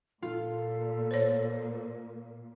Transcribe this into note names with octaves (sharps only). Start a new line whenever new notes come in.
A#2 F4 A4
C5 C#5